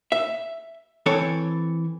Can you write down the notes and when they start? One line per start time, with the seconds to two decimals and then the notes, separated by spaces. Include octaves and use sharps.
0.12 E5
1.06 E3 C4 A4 C#5